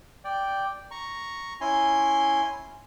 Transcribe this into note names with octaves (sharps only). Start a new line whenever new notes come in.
D5 G5
A#5 C#6
C#4 E4 G#5 C6